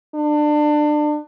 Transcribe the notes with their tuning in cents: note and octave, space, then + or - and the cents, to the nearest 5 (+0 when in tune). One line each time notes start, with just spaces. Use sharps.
D4 +25